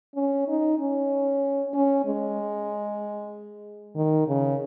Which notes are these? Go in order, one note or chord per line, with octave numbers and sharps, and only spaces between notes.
C#4
D#4
C#4
C#4
G#3
D#3
C#3